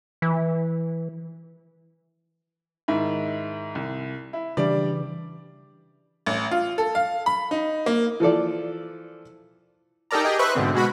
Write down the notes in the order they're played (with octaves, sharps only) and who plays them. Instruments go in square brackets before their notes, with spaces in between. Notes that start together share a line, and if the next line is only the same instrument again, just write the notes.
[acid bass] E3
[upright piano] G#2 D#3 E4
C2
E4
[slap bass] C#3 E3 [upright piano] G3 D4 D5
[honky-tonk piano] A1
F4
A4
F5
B5
D#4
A#3
[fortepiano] E3 F3 A4 D5
[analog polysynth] D#4 G4 A4 A#4 D5 A#5
G4 G#4 D#5 G5
B4 C5 E5 C#6 F#6
G#2 B2 D3 C4
B2 G#3 F#4 B5